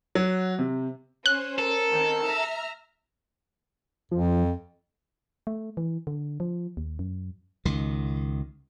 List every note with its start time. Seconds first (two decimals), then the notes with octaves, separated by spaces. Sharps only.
0.15 F#3
0.59 C3
1.26 C#4 C5 F#6
1.59 A4 A#4
1.90 D#3 C4
2.25 E5 A#5 F6
4.11 F2 F3
5.47 A3
5.77 E3
6.07 D3
6.40 F3
6.77 D#2
6.99 F#2
7.65 C#2 D#3